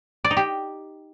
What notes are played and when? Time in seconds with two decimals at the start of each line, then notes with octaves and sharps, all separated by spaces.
0.25 D5
0.31 D#4
0.37 G4